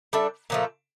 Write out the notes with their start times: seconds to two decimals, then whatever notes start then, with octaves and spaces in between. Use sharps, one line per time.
0.13 G3 D4 A4 E5
0.50 A#2 F3 A3